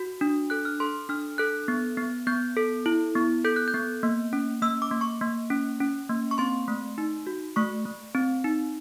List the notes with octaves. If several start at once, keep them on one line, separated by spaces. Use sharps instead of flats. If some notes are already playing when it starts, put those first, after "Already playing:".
Already playing: F#4
D4
A4 F#6
F6
A4 C6
D4 F6
A4 F#6
B3
B3
B3 G6
A4
E4
B3
A4 G6
F#6
G6
B3
A#3
C#4
A#3 E6
D6
A#3
C#6
A#3
C#4
C#4
A#3
C#6
C4 C6
A3
D#4
F#4
A3 C#6
A3
C4
D#4